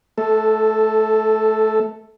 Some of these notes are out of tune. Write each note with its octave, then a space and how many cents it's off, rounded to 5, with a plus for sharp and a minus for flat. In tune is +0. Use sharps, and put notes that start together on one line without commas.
A3 -25 A4 +0